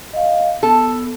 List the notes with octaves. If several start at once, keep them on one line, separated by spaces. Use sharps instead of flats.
D#5 F5
B3 A4